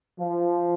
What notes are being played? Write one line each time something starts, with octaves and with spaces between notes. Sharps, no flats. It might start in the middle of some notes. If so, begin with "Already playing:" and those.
F3